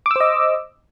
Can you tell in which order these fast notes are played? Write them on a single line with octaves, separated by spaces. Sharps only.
D6 E6 C5 D#5